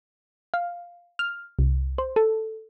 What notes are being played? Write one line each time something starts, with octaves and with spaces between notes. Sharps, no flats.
F5
F6
C2
C5
A4